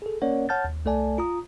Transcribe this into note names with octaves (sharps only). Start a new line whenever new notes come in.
G#4 A4
A#3 C#4 A#4 C#5 D5 F#5
C#5 F#5 A5 F6 G6 A6
D#2
C2 A3 A4 D5 G#5 A5
F4 A#5 D#6